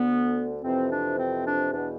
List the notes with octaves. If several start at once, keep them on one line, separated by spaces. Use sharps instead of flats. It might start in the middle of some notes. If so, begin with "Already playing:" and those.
Already playing: D2 D3 B3
F2 C3 E3 C4
D4
C4
D4
E2 B2 D4